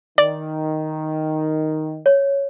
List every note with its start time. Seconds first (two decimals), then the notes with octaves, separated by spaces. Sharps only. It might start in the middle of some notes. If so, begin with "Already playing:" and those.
0.18 D#3 D5
2.06 C#5